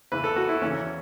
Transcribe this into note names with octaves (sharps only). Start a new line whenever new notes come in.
E2 C#3 E3 B4
A4
F#4
E4
E2 C#3 E3 C#4